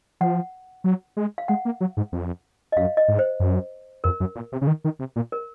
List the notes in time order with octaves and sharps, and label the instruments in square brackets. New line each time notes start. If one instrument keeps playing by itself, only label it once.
[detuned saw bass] F3 [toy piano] F#5
[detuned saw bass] F#3
G#3
[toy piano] F5
[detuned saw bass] G#3 [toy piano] F#5
[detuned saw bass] A#3
F#3
G#2
F2
[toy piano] D#5
[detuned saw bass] F#2 [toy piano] F5
[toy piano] D#5
[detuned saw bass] G#2
[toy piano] C5
[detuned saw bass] F#2
[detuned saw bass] F2 [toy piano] A#4
[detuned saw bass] F#2
A#2
C3
C#3
D#3
D#3
C3
A#2
[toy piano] A#4